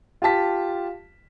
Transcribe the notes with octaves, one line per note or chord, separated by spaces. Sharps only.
F4 G4 A5 B6